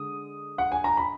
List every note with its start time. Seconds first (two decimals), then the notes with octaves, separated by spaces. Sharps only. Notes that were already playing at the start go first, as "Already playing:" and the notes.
Already playing: D3 G#3 D#6
0.58 F#5
0.72 G#5
0.84 A#5
0.97 B5